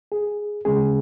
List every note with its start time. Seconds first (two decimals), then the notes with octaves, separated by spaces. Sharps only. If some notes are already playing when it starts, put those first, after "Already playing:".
0.12 G#4
0.65 D#2 C#3 G#3 C#4 G#4